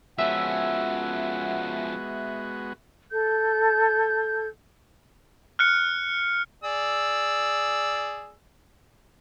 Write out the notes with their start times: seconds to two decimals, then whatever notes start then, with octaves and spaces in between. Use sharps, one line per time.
0.19 F3 G#3 B3 C#4 F#4 E5 F#5
3.11 A4 G6
5.59 F6 F#6 C#7
6.64 G#4 D5 E6